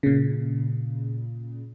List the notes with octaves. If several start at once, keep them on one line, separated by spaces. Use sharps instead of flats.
A#2 C#3